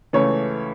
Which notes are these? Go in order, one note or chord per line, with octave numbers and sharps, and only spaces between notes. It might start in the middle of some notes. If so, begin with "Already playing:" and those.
C#2 C#3 E3 A3 C#5